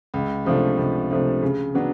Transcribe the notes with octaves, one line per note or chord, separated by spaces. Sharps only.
C#2
C3 F3 A3 D4
C#2
C3 F3 A3 D4
C#3
F#3 B3 D4